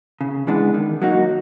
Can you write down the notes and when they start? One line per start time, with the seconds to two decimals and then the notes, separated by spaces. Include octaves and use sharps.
0.21 C#3
0.47 E3 G#3 B3 D4
0.74 D#3
1.02 F#3 A#3 D#4 F#4